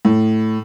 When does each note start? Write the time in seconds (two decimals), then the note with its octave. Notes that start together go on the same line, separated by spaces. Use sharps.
0.05 A2